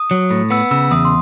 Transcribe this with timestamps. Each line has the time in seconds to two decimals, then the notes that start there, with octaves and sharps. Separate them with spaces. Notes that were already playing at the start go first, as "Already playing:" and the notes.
Already playing: D#6
0.11 F#3
0.31 A2
0.50 B3 E6
0.71 C#3 E6
0.91 E2 D#6
1.05 C6